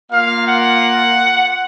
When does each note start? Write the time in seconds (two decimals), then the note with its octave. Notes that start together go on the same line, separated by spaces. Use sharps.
0.11 A#3 F4 F5
0.46 F#5